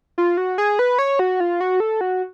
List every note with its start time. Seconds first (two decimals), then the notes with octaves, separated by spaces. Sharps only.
0.18 F4
0.37 F#4
0.58 G#4
0.79 B4
0.99 C#5
1.19 F#4
1.40 F4
1.61 F#4
1.80 A4
2.01 F#4